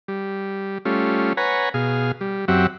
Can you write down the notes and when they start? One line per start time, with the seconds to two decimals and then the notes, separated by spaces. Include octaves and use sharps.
0.08 G3
0.85 G3 A3 C#4 F4
1.37 B4 C#5 F#5 G#5 A#5
1.74 B2 G#4 F5
2.21 G3
2.48 F#2 F#3 C4 G4 E5 F#5